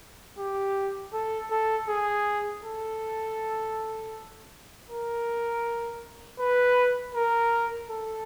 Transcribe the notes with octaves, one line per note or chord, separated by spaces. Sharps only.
G4
A4
A4
G#4
A4
A#4
B4
A#4
A4